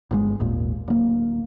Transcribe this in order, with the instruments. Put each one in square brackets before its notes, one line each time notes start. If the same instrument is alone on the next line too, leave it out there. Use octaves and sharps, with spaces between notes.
[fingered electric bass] G1 D#3 G#3
G#1 D#2 A#2
D1 A#3